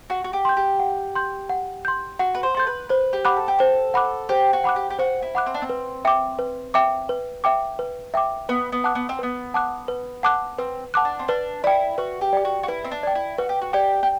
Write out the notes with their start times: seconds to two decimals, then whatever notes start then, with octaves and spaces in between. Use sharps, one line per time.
0.10 F#4 F#5
0.24 F#4
0.33 G4
0.45 C6 G6
0.57 G4
0.80 F#5
1.15 C6 G6
1.49 F#5
1.85 C6 G6
2.19 F#4 F#5
2.35 B4
2.43 C5
2.55 A4 C6 G6
2.67 B4
2.89 B4 C5
3.13 G4
3.25 F#5 B5 D6 F#6
3.37 A4
3.48 G4
3.59 A4 C5
3.94 F#5 B5 D6 F#6
4.29 G4 C5
4.53 F#4
4.64 F#5 B5 D6 F#6
4.76 G4
4.90 G4
4.99 F#4 C5
5.22 E4
5.35 F#5 B5 D6 F#6
5.46 C4
5.54 D4
5.62 C4
5.70 B4
6.05 E5 G5 D6
6.39 B4
6.74 E5 G5 D6
7.09 B4
7.44 E5 G5 D6
7.79 B4
8.14 E5 G5 D6
8.49 B3 B4
8.72 B3
8.84 F#5 A5 D6 F#6
8.95 B3
9.09 C4
9.19 B3 B4
9.54 F#5 A5 D6 F#6
9.88 B4
10.23 F#5 A5 D6 F#6
10.58 C4 B4
10.94 F#5 A5 D6 F#6
11.05 D4
11.19 C4
11.28 D4 B4
11.64 E4 D5 G5
11.98 F#4 B4
12.21 G4
12.33 D5 G5
12.45 F#4
12.63 F#4
12.68 E4 B4
12.84 C4
12.91 D4
13.03 D5 G5
13.15 E4
13.38 F#4 B4
13.49 G4
13.61 F#4
13.73 G4 D5 G5
14.03 G4